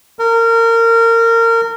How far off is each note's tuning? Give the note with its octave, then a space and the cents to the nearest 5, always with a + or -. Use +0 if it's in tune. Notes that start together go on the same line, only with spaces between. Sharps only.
A#4 -25